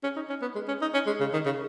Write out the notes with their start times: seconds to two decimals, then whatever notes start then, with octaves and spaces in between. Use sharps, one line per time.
0.03 C#4
0.16 D#4
0.29 C#4
0.42 B3
0.55 G#3
0.68 C#4
0.82 D#4
0.94 C#4
1.06 G#3
1.20 C#3
1.33 D#3
1.45 C#3